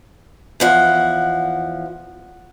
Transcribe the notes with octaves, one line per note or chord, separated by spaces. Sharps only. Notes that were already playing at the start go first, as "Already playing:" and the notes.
E2 F3 F#5